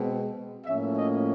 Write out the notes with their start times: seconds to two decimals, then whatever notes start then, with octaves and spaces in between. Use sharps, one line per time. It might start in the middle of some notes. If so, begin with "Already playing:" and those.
Already playing: B2 G#3 C4
0.65 A2 F3 A#3 C#4 E5
0.96 D#5